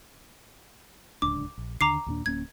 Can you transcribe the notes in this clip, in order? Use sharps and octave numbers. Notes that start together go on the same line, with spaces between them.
D1 C#2 D4 D6
A#1
D#2 D3 A#5 D6 C7
D#2 A#2 D4
D1 A#3 C#4 G#6